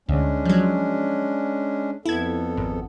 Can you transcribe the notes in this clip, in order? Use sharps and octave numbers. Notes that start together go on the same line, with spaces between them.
D2 G#3 C#4 D4
F3 F#3
F2 B3 E4 A4 G#6
G#1